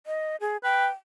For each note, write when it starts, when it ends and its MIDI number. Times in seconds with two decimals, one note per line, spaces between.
0.06 0.36 75
0.41 0.57 68
0.64 0.87 71
0.64 0.89 79